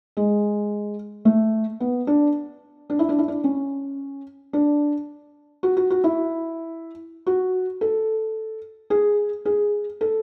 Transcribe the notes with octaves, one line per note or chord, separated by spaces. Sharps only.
G#3
A3
B3
D4
D4
E4
D4
E4
D4
C#4
D4
F#4
F#4
F#4
E4
F#4
A4
G#4
G#4
A4